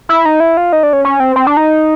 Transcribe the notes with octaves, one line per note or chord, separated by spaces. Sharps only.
E4
D#4
E4
F4
D#4
D4
C#4
C#4
C4
C4
D4
D#4